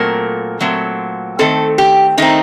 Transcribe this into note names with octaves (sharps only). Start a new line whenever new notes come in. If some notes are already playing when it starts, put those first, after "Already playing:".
Already playing: A#2 F#3 A3 C4 A#4
A#2 F#3 A3 C4
D#3 A3 C4 A4
G4
D#3 A3 C4 D#4